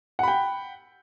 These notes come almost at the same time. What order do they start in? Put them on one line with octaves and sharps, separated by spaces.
F#5 B5 G5